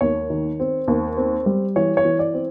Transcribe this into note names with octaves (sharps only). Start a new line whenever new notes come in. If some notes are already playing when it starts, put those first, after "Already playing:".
D#2 C#5
D#3
C4
D#2
C4
G3
E3 C#5
C#5
E3
D5
C4